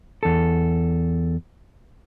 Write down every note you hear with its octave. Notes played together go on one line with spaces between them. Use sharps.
E2 A4